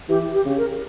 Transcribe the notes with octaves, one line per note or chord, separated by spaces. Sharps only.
E3 G4
G4
C#3
A#4